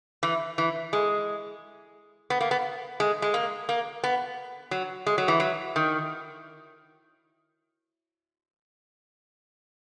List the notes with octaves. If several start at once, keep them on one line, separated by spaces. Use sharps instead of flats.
E3
E3
G#3
B3
A#3
B3
G#3
G#3
A#3
A#3
B3
F#3
G#3
F#3
E3
F#3
D#3